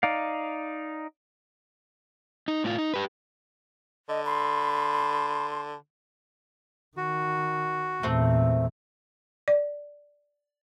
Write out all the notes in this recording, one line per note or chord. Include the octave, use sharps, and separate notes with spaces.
D#4 D5 F5
D#4
A2 F4
D#4
G4 B4
D3 D#5
B5 C6
D#3 F#4
E2 A#2 A3 C4
D5